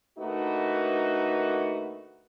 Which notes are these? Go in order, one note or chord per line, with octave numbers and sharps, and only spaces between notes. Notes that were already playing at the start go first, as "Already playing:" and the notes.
D3 A3 A#3 D#4 F#4 B4